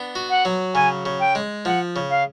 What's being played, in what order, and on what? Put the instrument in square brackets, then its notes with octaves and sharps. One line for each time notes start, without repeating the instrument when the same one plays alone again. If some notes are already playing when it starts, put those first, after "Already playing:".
Already playing: [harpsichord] B3 D4
F#4
[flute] F#5
[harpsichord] F#3
[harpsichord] C#3 [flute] G#5
[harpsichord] C#3
[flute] G5
[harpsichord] G#3
[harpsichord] F3 [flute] F#5
[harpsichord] C#3
[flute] F5